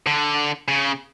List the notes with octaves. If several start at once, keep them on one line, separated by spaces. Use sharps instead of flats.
D3
C#3